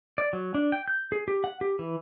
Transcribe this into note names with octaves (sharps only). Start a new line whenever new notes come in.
D5
F#3
D4
G5
G6
G#4
G4
F#5
G4
E3